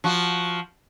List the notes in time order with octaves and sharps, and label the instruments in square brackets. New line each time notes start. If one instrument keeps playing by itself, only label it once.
[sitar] F3 F#4